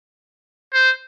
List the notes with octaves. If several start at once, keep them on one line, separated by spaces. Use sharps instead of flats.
C5